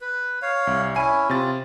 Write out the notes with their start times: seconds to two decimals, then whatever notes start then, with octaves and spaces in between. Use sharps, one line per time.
0.01 B4
0.42 C#5 F5
0.67 C2
0.96 C#4 E4 G#5 D#7
1.30 C3 F4 A6